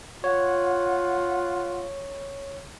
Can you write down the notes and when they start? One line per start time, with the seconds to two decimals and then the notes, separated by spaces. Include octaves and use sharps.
0.24 F4 C#5 F#5